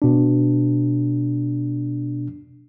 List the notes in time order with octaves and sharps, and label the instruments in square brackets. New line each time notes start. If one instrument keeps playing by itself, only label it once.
[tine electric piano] B2 D4